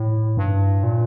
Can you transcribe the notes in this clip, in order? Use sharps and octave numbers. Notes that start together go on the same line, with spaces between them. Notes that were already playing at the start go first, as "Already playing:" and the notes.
Already playing: A2
G2
A#2